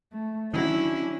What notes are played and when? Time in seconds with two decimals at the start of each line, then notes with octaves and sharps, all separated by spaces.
0.12 A3
0.54 D#3 E3 F#3 C#4 D4 E4